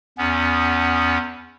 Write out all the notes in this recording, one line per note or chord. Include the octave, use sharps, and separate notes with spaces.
E2 B3 C#4